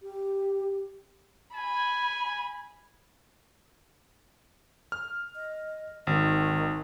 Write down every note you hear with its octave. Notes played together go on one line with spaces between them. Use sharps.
G4
G#5 B5
F6
D#5
G#1 D#3